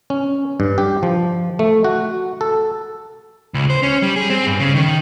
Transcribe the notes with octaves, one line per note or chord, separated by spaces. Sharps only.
C#4
G2
G4
F3
A3
F#4
A4
C#2
C5
C#4
G3
G#4
C4
G2
C#3
D#3